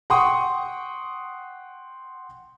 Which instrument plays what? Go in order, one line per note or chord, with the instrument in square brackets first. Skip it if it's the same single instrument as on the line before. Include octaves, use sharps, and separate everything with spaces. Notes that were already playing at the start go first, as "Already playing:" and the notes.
[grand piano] F#5 G5 C6 C#6 D#6